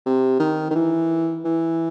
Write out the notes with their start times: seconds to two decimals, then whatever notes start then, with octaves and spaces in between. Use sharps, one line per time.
0.06 C3
0.40 D#3
0.70 D#3
0.75 E3
1.45 E3